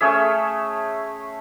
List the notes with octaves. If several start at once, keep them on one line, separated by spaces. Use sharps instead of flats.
A3 C#4 G#4 E5